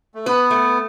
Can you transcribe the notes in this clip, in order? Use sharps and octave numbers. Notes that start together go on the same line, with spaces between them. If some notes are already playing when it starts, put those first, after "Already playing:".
A3
B3 B4
A3